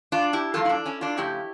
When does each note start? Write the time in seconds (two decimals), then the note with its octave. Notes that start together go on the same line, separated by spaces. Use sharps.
0.12 D4 F4
0.33 E4 G4
0.54 G2 F3 A#3 F4 A4
0.65 E4
0.69 D4
0.85 C#4 E4
1.01 D4 F4
1.17 C#3 F3 A3 E4 G4